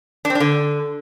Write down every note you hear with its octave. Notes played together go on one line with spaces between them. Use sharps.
D4
C4
D4
D3